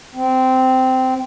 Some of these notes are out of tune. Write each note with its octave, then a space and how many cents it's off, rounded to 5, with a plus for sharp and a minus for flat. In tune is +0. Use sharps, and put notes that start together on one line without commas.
C4 -15